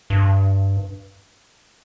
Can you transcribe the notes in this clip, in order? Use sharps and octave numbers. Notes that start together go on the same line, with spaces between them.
G2